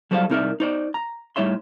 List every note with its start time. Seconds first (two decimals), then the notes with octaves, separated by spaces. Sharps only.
0.11 F#3 G3 A4 C5 E5 F5
0.29 C2 C4 D#4 A#4 D5 E5
0.60 D#4 C5 D5
0.94 A#5
1.36 A2 G3 D#4 C#5 E5 C6